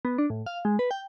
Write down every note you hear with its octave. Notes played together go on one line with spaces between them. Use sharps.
B3
D4
A2
F5
G#3
B4
G5